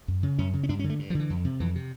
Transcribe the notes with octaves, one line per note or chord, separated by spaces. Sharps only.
F#2
C#3
F#2 C#4
C#3
C#4
G2 D4
C#4
D3
A3
G2
F3
D3 E3
F2
C3
F2 E3
C3